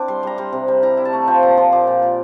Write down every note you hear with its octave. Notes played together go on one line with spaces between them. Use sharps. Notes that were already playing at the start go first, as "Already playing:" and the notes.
Already playing: C4 D4 E4 C5 D5 G5 D6
G3 C6
G3 A#5
G3 C6
C3
G3
E4 A#5
E4
A5
A3
F3 G5
A#2 A#5
F3 C6
A#2 D6
A#2
A#2